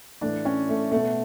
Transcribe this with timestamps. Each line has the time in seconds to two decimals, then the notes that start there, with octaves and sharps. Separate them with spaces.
0.21 A2 E3 D4
0.45 C#4
0.69 A3
0.92 B2 A3